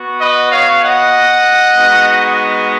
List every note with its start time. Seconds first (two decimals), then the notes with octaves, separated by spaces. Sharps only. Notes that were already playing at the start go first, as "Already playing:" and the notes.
Already playing: B3 F#4
0.20 B4 D#5
0.52 C#5 F5
0.83 D#5 F#5
1.76 G#3 B3 D#4 F#4